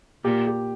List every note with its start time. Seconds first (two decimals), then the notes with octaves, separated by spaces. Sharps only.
0.24 A#2 G4
0.47 G4